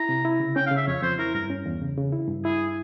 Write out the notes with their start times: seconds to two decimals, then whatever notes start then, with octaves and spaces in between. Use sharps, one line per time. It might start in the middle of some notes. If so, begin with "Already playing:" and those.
Already playing: E4 A#5
0.09 C3
0.25 E4
0.40 C#3
0.56 C#4 G5
0.66 F5
0.71 C#3
0.77 E5
0.87 F2 C#5
1.03 F2 C5
1.19 E4 A#4
1.34 G2 A#4
1.50 C#4
1.66 E2
1.81 C#3
1.98 C#3
2.12 E4
2.28 G2
2.44 E4 G#4